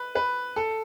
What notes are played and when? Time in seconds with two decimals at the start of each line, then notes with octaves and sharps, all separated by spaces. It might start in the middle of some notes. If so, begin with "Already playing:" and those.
Already playing: B4
0.15 B4
0.56 A4